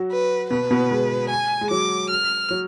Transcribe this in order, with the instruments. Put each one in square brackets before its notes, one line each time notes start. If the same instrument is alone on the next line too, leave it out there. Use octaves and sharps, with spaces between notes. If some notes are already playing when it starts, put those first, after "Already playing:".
Already playing: [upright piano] F#3 F#4
[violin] B4
[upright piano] B2 B3 [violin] B4
[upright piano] B2 B3
G#3
[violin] G#5
[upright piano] G#3
[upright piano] F#3 [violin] D6
[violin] F6
[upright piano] F#3